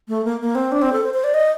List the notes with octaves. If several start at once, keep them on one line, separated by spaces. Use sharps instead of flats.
A3
A#3
A#3
C4
D4
C4
A4
C5
C5
D5
D#5